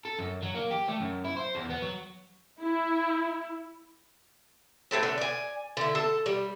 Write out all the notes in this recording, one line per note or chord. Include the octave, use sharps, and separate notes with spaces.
A4
F#2
F#3
A#3
G4
A3
F#2
E4
C5
E2
B3
F#3
E4
A2 C3 A3 C4
D3 C#4
D5 G#5
D3 E4
A4
G3